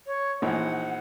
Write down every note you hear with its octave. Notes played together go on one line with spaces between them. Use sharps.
C#5
A#1 E3 D#4 F#5